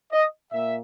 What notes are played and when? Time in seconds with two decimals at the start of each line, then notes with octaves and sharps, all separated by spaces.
0.13 D#5
0.52 A#2 A#3 E5